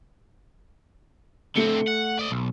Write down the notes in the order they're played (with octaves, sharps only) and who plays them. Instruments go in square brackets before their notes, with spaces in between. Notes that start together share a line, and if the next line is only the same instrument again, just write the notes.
[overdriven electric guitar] D3 C4 [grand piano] A3 C#7 G7
[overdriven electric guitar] F#5
D5 D#5
B1